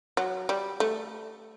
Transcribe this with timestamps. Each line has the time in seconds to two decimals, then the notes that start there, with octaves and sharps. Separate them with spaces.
0.17 F#3
0.49 G3
0.80 A3